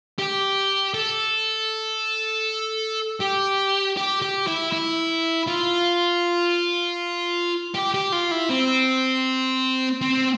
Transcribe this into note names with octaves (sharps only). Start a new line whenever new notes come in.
G4
A4
G4
G4
G4
E4
E4
F4
G4
G4
F4
E4
C4
C4